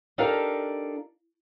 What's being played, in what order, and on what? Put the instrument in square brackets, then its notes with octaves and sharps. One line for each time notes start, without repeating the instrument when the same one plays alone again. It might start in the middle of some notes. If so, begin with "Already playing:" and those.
[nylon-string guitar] D4 D#4 G4 A4 A#4 F5